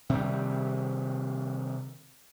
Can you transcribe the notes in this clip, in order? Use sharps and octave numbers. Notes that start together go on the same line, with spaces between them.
C3 D#3 G3